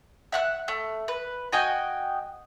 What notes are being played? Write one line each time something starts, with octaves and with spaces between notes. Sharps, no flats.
E5 F#5 F#6
A3
B4
F#4 D#5 G5 G#5